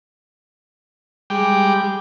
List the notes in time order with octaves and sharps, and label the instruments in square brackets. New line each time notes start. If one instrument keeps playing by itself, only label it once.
[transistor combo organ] G3 G#3 G5 D6